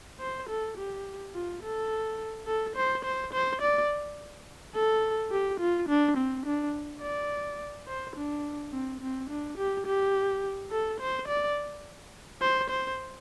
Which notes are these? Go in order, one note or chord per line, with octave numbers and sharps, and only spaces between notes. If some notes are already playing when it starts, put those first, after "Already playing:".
C5
A4
G4
F4
A4
A4
C5
C5
C5
D5
A4
G4
F4
D4
C4
D4
D5
C5
D4
C4
C4
D4
G4
G4
A4
C5
D5
C5
C5